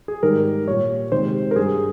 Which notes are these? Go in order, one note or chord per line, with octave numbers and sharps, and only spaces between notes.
G#4
G#2 D#3 G3 A#4
A#2 G3 C#5
C3 D#3 G#3 C5
A#4
G2 G3 G#4